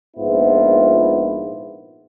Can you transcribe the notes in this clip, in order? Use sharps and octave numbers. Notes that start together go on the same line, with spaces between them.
A#1 G#2 B3 E4 F4